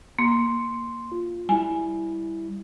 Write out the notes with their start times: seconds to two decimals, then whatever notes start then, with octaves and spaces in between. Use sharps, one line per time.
0.19 A#3 C6
1.12 F4
1.49 G3 E4 G#5